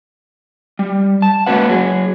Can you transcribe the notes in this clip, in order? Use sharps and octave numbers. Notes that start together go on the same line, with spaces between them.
G3
A5
G#3 A#3 C#4 F#4 B4 F#5
F#3 G#4